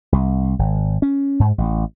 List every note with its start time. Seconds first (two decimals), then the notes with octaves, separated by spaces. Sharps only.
0.12 C2
0.59 G#1
1.02 C#4
1.40 G#2
1.58 A1